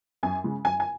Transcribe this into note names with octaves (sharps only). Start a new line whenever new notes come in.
F#2 G#5
C#3 G#3
F#2 G#5
G#5